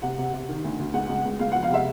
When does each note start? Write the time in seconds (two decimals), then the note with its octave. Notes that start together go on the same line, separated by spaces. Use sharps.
0.02 C3 F#5
0.18 C3
0.33 C3
0.49 D#3
0.64 D2
0.79 D2
0.94 C#2 F#5
1.09 C#2
1.25 C#2
1.39 C#2 F5
1.52 F3 F#5
1.63 F5
1.70 C3 E5